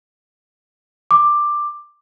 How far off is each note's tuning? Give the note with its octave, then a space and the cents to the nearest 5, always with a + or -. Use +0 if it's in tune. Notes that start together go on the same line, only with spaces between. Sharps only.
D6 +10